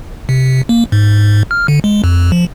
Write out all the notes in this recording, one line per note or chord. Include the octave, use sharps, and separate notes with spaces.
C3
A#3
G#2
F6
D3
G#3
F2
F3